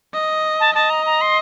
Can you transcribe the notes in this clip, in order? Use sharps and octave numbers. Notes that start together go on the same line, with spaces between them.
D#5
A5
D#5 A5
A#5
A#5
C6